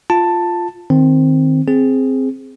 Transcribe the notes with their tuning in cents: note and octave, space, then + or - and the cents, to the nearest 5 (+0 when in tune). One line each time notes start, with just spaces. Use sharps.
F4 +0 A5 +10
D#3 +0 C4 +0
C4 +0 G#4 +0